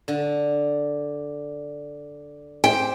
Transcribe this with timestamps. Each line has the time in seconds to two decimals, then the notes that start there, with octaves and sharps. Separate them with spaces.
0.08 D3
2.64 C4 G4 G5